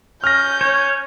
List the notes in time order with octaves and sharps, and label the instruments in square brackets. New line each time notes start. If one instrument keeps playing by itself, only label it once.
[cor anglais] C#4 [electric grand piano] F6 A#6 [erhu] G6
[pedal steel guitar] C#5